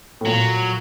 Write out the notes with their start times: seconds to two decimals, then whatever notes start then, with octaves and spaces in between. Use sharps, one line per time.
0.21 A2
0.25 A#2 F#3